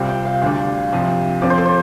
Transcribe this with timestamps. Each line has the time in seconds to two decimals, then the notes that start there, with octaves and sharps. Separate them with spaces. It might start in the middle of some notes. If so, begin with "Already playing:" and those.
Already playing: C2 C3 G3 C4 F4
0.08 G5
0.25 F5
0.42 D2 D3 G3 D4 F5
0.92 C2 C3 F3
1.42 F2 F3 C4 D5
1.50 C5
1.58 A4
1.65 C5